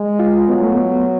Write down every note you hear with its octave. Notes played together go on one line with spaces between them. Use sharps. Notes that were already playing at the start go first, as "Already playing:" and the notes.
Already playing: G#3
F4
F#3 B3
A3
B3